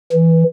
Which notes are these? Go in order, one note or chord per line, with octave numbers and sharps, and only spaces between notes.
E3